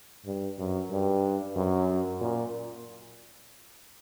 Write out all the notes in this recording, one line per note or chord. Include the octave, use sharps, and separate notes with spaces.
G2
F#2
G2
F#2
A#2